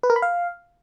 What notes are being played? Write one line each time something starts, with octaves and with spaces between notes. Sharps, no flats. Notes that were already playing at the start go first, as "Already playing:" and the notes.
B4
A#4
B5
F5